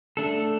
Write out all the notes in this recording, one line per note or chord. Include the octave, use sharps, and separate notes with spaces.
A3 D4 A4